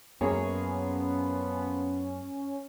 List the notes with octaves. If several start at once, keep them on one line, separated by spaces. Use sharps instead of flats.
F#2 F3 A#3 B3 C#4 G#4 C#5